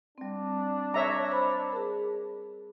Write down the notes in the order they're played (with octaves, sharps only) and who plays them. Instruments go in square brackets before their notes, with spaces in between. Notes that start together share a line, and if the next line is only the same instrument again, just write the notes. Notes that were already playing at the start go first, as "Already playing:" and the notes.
[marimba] G3 C4 [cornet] D4
[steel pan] C#5 E5 A#5
[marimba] C5 B5
G#4 A#4